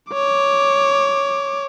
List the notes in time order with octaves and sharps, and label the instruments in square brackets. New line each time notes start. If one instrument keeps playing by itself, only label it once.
[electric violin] C#5 D6